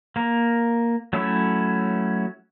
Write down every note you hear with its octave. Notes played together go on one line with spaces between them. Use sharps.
A#3 A#4
F#3 A3 C#4 E4 E6